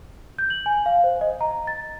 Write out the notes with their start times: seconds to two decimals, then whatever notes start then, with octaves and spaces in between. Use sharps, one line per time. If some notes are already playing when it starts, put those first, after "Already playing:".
0.39 G6
0.50 F#7
0.66 G#5
0.86 F5
1.04 C5
1.21 D#5
1.41 A#5
1.67 A6